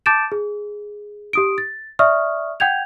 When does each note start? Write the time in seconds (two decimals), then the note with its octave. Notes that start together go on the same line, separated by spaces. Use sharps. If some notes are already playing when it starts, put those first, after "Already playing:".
0.06 A5 D6 G6 A6 D7 E7
0.32 G#4
1.33 G4 D#6 D7
1.58 A6
1.99 D5 E5 C#6 D#6 F6
2.60 F#5 G5 G6 G#6 F7